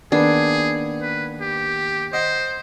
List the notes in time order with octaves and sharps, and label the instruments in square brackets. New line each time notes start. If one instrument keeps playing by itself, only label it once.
[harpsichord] D#2 B3 [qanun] D4 [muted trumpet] G#4
[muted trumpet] B4
G4
[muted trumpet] C5 [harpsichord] D#5 F#5